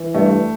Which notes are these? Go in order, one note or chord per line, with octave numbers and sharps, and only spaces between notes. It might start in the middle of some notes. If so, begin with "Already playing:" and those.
Already playing: E3
G2 A3